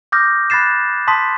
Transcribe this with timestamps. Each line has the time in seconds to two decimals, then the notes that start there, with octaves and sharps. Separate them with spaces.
0.12 D6 D#6 F6 G6 A#6
0.50 B5 F#6 A6 C7 E7
1.08 A5 C6 D#6 B6